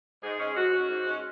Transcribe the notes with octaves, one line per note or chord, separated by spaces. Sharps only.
G#2 G#4
G#3 C#4
G#2 F#4
G#3 C#4
G#2
G#3 C#4